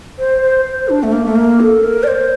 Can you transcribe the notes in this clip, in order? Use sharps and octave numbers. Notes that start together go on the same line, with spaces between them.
C5
C5
C5
D4
A3
A#3
A3
A#3
A4
A#4
D5
C5